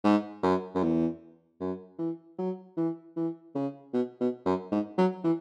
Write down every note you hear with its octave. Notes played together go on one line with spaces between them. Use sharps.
G#2
F#2
F#2
E2
F#2
E3
F#3
E3
E3
C#3
B2
B2
F#2
G#2
F#3
E3